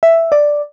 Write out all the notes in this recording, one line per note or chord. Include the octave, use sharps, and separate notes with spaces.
E5
D5